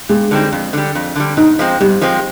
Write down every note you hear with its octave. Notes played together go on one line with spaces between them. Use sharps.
G2 G#3
D3 G3 C4 D#4
F2
D3 G3
F2
D3 G3
G#2 D#4
F3 G#3 C4
G#2 G3
F3 G#3 C4